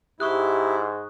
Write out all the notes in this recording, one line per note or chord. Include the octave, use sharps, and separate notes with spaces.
G#2 E4 G4 C#6 D#6 F#6